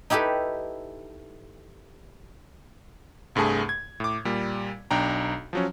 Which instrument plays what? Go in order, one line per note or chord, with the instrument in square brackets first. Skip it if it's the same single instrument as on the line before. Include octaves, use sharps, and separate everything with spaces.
[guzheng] D#4 E4 G4 A4 B4
[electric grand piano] C2 G2 A3 G#4 A5
G#6
A2 D6
A#2 G3
B1 D4 G5 A#5
F3 F#3 C#4